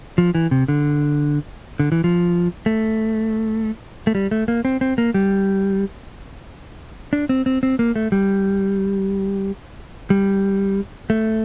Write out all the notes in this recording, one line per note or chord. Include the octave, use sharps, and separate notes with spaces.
F3
E3
C3
D3
D3
E3
F3
A3
A3
G3
A3
A#3
C4
C4
A#3
G3
D4
C4
C4
C4
A#3
A3
G3
G3
A3